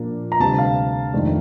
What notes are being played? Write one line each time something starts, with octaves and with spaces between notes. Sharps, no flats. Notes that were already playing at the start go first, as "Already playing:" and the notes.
Already playing: A#2 F3 A#3 D4
A#5
D2 C3 G3 A5
F5
F2 D#3 A3 D4